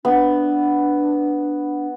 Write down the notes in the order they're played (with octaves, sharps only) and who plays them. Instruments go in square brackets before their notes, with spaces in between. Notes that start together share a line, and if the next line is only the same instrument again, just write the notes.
[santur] B3 [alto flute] D4